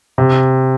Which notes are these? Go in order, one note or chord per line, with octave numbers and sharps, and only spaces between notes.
C3